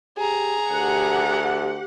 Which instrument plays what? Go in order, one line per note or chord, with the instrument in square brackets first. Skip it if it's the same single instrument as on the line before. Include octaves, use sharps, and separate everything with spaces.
[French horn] G4 [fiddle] G#4 A#5
[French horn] D2 [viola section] G4 F#5